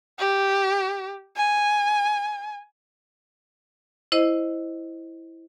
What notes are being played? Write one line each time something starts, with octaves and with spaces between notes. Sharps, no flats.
G4
G#5
E4 C5 D#5